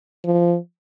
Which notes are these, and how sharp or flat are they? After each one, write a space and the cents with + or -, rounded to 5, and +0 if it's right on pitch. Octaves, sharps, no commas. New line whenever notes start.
F3 -15